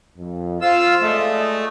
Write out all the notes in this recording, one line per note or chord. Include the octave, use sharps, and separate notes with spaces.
F2
F4 C5 F5 E6
G#3 A3 D5 D#5